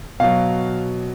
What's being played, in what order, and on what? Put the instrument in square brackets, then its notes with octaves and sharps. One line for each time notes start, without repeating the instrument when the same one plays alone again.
[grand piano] B2 F#3 F5